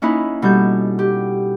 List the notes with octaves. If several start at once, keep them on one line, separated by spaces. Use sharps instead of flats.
A#3 C#4 D#4 E4 B4
B2 G3 A4 G6
G4